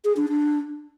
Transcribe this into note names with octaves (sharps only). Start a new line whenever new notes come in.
G#4
D4
D4